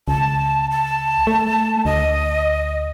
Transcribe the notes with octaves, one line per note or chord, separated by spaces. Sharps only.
C#2 A5
A5
A3
D2 D#5